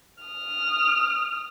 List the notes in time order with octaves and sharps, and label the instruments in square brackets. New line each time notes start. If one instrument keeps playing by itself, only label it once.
[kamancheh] D#6 F6